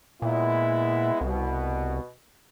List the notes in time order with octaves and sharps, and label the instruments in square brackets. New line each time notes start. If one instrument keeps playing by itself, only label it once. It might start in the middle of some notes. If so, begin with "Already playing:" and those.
[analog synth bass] A#2 [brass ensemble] G#3 B3 E4
[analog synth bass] C2 [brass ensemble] B2